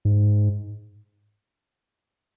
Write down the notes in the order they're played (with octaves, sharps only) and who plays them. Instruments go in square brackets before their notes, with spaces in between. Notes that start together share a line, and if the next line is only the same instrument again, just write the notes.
[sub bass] G#2